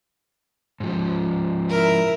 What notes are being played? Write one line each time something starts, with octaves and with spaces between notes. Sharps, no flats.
G#2 F3
E4 A#4